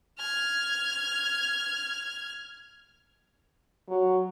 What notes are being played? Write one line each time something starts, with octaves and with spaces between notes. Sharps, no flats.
F6 G#6
F#3